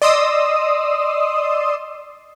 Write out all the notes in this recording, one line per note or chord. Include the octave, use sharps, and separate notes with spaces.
D5 D#5 C6 D#6 E6